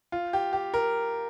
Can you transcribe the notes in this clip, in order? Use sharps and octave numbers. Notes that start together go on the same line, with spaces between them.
F4
G4
G4
A#4